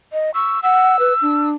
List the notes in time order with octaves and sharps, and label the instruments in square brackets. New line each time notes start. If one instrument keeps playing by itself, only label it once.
[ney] D#5
[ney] C#6 [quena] E6
[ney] F#5 [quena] E6
[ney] B4
D4